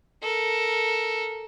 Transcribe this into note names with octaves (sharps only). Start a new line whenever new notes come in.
A4 A#4